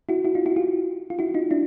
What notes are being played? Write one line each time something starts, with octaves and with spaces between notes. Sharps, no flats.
E4 F#4
E4 F#4
D#4 F4
E4 F#4
F4 G4
F4
E4 F#4
D#4 F4
D4 E4